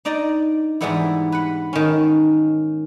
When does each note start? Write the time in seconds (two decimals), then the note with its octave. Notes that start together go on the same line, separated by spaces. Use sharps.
0.05 D4 D#4 D5 D#5
0.81 G#2 E3 G3 B3 D4 E4
1.32 B4 F#5
1.73 D#3 C#4